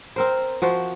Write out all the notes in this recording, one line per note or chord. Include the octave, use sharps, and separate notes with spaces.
C4 A#4 C5
F3 F#4 C5